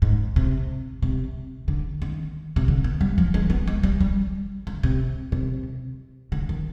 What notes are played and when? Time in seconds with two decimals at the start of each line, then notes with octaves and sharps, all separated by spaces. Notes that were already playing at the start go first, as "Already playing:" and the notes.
0.02 G#2
0.36 C3
1.02 C3
1.68 D3
2.02 D#3
2.56 C3
2.68 D3
2.84 B3
3.01 G3
3.18 F3
3.34 G#3
3.50 B3
3.67 G#3
3.83 G3
4.01 G3
4.67 D3
4.83 C3
5.32 C3
6.32 D3
6.49 D#3